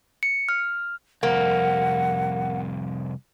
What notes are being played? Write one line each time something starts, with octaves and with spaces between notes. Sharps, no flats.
C#7
F6
C2 F2 A#3 F#5